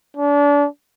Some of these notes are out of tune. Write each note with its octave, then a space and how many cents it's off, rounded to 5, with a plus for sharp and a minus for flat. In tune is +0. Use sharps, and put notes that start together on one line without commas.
D4 -30